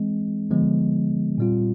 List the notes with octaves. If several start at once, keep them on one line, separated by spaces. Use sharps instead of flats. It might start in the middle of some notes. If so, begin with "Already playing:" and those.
Already playing: E3 G#3 C4
D3 F3 G#3 B3
A#2 G3 C4 F4